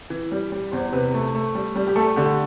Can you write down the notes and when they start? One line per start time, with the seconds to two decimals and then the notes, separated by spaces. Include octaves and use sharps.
0.10 E3
0.32 G3
0.52 G3
0.72 E2 C5
0.93 C3 B4
1.14 A3
1.35 A3
1.55 G3
1.75 G3
1.87 G4
1.96 A3 A4
2.16 D3 G4